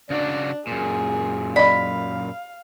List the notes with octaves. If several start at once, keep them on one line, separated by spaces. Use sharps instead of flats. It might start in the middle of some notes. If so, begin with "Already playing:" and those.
C#3 D4 F#4 D5
F#2 A#2 G#4
D5 D#5 F5 B5